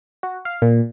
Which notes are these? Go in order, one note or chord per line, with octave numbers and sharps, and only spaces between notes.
F#4
F5
A#2